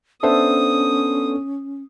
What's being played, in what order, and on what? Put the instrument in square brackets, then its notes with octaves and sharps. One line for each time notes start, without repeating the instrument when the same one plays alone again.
[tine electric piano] B3 D4 A4 [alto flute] C#4 [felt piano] C5 E5 [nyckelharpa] D#6